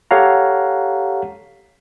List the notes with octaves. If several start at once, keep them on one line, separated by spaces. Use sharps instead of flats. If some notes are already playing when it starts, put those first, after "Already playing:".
G4 A4 C#5 F5 F#5 A#5